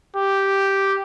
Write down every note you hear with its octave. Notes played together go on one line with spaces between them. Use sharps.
G4